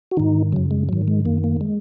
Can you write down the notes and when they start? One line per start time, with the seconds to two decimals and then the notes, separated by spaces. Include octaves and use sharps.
0.11 F#4
0.17 G#2 D#3 D#4
0.52 F#2 C#3 F#3
0.71 G#3
0.89 G#2 D#3 F#3
1.08 G#3
1.25 F#2 D#3 A#3
1.44 A#3
1.61 G#3